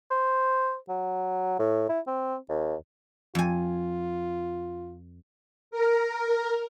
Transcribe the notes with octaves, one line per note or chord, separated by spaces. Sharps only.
C5
F#3
A2
E4
C4
D#2
F2 F4 G#5
A#4